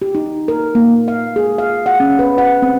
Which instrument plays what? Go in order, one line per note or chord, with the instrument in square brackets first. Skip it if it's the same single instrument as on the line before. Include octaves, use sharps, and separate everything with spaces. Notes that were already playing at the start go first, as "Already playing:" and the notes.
[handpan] G4
D#4
A#4
A#3
F5
G#4
F5
F#5
C#4
B4
F#5
C4